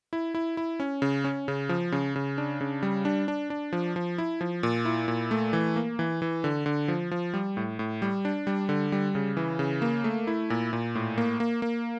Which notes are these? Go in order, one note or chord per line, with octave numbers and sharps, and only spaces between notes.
E4
E4
E4
C#4
C#3
C#4
C#3
F3
C#3
C#3
D4
C#3
G3
D4
D4
D4
F3
F3
E4
F3
A#2
E4
A#2
A3
E3
A#3
E3
E3
D3
D3
F3
F3
G3
A2
A2
G3
D4
G3
D3
G3
C#3
E3
C#3
A#3
A3
E4
A#2
A#2
A2
A#3
A#3
A#3